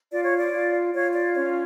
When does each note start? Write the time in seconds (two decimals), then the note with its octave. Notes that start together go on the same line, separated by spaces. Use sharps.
0.10 F4 D5
0.24 C#5
0.37 D5
0.52 F4
0.93 F4 C#5
1.14 D5
1.34 C#4 C#5